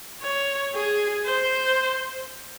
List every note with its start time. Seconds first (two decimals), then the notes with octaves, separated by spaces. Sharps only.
0.22 C#5
0.74 G#4
1.25 C5